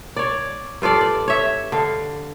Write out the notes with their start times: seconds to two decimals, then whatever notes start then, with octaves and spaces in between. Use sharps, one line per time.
0.16 C#5 D5
0.82 G2 F4 A4 D5
1.01 D5
1.28 C#5 E5
1.72 D3 F5